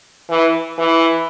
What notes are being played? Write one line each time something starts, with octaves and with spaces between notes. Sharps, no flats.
E3
E3